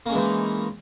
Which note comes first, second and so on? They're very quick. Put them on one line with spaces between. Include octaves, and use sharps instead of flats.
A#3 C#4 G#3 E3 D#4